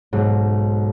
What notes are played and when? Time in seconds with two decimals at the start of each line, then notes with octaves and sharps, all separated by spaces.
0.13 B1 G#2